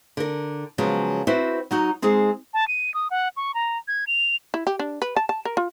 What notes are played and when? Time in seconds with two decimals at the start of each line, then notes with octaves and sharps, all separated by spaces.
0.17 D3 A#4
0.78 C#3 F3 F#3 G#3 B3 C#4
1.27 C4 E4 F#4 B4 C5
1.71 F#3 D#4 F#4
2.02 G#3 C4 D#4 G#4
2.54 A5
2.68 D#7
2.94 D#6
3.11 F#5
3.37 C#6
3.54 A#5
3.88 G#6
4.07 F7
4.54 E4
4.67 G4
4.79 D4
5.02 B4
5.16 A5
5.29 A5
5.45 A#4
5.57 F4